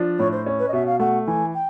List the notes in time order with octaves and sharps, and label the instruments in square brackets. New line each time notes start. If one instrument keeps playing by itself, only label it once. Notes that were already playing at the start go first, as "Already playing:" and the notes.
Already playing: [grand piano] F3 D4
[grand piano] A2 [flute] C#5
[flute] C5
[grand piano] C#4
[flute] B4
D#5
[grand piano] B2 [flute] E5
[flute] F5
[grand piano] A3 [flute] F#5
[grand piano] E3 [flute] G#5
[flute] G5